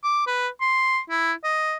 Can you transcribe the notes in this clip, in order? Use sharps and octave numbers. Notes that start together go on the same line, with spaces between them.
D6
B4
C6
E4
D#5